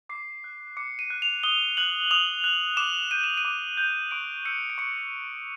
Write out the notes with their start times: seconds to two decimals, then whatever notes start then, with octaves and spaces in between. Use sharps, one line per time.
0.09 D6 C7
0.44 F#6
0.77 D6 C#7
0.99 D#7
1.10 F#6
1.22 F7
1.43 D#6 G7
1.77 F#6 F#7
2.11 D#6 F7
2.44 F#6
2.77 D6 E7
3.11 G6 D#7
3.24 E7
3.37 D#7
3.45 D6
3.77 G6
4.11 C#6 D7
4.45 E6 G6 C#7
4.70 D7
4.78 C#6 C#7